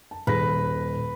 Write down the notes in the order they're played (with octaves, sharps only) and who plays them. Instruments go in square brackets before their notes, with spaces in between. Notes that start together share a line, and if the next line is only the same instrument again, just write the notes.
[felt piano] A5
[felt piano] D#1 G#4 A#6 [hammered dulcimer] B4